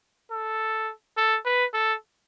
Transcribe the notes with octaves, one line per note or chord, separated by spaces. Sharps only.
A4
A4
B4
A4